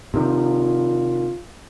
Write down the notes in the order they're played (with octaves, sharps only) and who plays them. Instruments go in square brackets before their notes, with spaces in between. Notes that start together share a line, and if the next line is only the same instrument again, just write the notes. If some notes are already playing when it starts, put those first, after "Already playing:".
[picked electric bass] C3 D#3 [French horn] F4